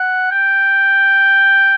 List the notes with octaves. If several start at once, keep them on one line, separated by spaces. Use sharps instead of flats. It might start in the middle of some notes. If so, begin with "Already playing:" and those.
Already playing: F#5
G5